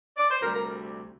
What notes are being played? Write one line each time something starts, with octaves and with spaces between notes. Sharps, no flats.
D5
C5
D2 C3 G3 A#4
A#4